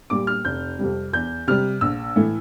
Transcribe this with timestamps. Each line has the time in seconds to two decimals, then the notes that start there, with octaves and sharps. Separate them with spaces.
0.10 A#2 G3 D6
0.27 F6
0.45 F1 G6
0.79 F2 C3 G3
1.13 E2 G6
1.47 C3 G3 F6
1.81 A#1 E6
2.16 A2 E3 A3